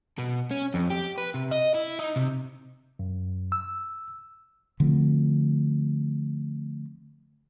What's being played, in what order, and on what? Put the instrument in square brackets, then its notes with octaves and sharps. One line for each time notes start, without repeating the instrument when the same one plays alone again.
[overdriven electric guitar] B2
C#4
F2
G4
B4
C3
D#5
E4
D#4
C3
[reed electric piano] F#2
E6
[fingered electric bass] D3 F3 A3 C4